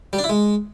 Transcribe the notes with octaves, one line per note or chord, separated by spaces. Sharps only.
G3
D4
E4
G#3